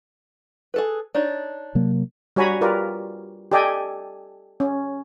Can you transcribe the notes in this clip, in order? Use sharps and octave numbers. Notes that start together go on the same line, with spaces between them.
G#4 A4 B4
D4 D#4 C#5
C3 F#3 A#3
G3 F#4 C#5 G#5 A#5 B5
F4 G4 A#4 B4 D5
G4 A4 D5 D#5 G5 G#5
C#4